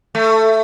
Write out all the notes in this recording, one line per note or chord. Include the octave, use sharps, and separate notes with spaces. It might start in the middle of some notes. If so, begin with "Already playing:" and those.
A3